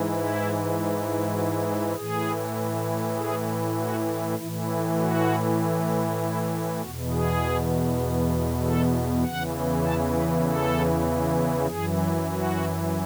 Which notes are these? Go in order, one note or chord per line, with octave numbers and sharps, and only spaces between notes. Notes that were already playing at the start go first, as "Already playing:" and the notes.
Already playing: G#2 E3
E4
F#4
G#4
A2 E3 G#4
G#4
F#4
A2 E3 E4
E4
F#4
E4
E2 B2 F#4
G#4
A4
E2 C#3 E3 F#5
A5
B4
A4
F#2 E3 G#4
F#4